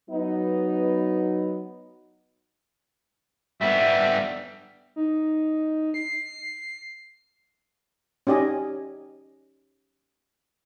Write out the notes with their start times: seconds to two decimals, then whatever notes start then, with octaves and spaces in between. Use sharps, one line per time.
0.10 F#3 B3 D#4
3.61 G3 B3 E5
4.96 D#4
5.94 C7
8.27 C#4 D#4 G4 D5 D#5 G#5